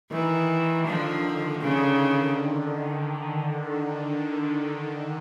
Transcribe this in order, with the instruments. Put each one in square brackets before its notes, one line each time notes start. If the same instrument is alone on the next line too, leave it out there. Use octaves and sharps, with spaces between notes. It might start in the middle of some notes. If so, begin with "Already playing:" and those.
[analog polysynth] D#3 [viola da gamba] E3
[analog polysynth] D#3
D#3
D#3
[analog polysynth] D3 [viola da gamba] F3
[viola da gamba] C#3